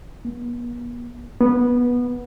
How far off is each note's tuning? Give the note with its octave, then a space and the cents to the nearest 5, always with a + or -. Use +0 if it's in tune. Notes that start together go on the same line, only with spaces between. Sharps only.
B3 -45
B3 -15